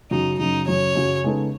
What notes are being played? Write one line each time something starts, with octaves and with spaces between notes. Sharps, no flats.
F#2 C#3 F#3 D#4
F#2 C#3 F#3 D#4
F#2 C#3 F#3 C#5
F#2 C#3 F#3
C#3 G#3 B3 D#4 A4